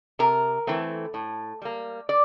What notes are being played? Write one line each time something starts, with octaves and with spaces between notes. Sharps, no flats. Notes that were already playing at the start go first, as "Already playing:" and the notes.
C3 A#4
E3 A3 C4
A2
G3 A#3
D5